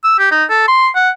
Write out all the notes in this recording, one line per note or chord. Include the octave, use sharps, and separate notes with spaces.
E6
G4
D#4
A4
C6
F#5